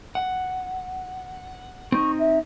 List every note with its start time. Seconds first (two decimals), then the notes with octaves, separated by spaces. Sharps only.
0.15 F#5
1.92 C4 D#4 C#6
2.19 E5